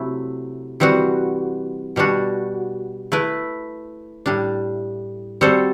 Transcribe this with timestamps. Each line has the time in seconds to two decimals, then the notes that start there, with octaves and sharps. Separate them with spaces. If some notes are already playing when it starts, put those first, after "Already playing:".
Already playing: C3 F#3 A3 E4
0.80 E3 G3 C4 F#4
1.96 B2 G3 D4 F#4
3.12 A3 E4 B4
4.26 A2 G3 D4
5.41 G3 C4 F#4 A4 C5